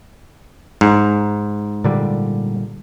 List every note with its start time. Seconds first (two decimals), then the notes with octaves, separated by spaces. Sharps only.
0.81 G#2
1.84 A#2 D3 G3